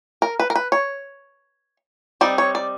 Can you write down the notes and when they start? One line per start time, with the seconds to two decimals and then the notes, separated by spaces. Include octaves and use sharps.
0.22 A#4
0.40 B4
0.50 A#4
0.56 B4
0.72 C#5
2.21 G3 C4 D#4 D5
2.38 C#5
2.55 D5